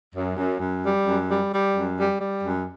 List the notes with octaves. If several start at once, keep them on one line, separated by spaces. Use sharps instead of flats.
F#2
F#2
F#2
G3
F#2
G3
G3
F#2
G3
G3
F#2